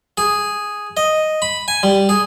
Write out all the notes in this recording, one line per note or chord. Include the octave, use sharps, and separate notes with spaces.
G#4
D#5
B5
G#5
G3
G#4